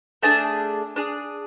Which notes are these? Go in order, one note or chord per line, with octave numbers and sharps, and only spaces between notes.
A3 D4 G#4 A5
D4 G#4